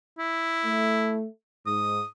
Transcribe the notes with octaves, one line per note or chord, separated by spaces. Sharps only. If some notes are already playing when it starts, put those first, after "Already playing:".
E4
A3
G#2 D#6